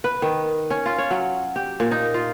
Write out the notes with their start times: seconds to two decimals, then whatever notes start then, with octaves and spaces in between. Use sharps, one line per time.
0.04 B4
0.22 D#3
0.70 C#4
0.86 F4
0.98 C#5
1.11 F#3
1.56 G4
1.80 A#2
1.91 D#4
2.14 F4